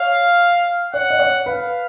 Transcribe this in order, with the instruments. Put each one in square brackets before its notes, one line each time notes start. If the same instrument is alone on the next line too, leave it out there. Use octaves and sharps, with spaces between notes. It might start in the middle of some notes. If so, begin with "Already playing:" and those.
Already playing: [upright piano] C#5 [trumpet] F5
[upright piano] C#5 [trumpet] F#5
[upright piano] D#5
C#5
[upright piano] B4 [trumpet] F5